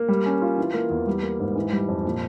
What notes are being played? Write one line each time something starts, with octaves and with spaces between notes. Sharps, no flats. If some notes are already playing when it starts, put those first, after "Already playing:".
Already playing: A#3
G3
C#4
F4
E3
A#3
E2
G3
A#3
G#2
E3
G3
F2
A#2